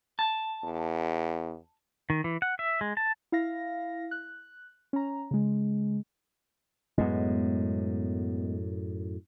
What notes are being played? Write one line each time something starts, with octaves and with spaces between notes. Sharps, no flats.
A5
E2
D#3
E3
F#5
E5
G#3
A5
E4 F5 A#6
F#6
C#4 A#5
C#3 G#3
F#2 A2 G#3 B3